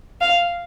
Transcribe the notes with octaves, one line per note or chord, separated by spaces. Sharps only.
F5